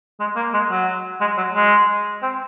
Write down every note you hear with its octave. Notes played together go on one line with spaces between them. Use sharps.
G#3
A#3
G#3
F#3
G#3
F#3
G#3
C4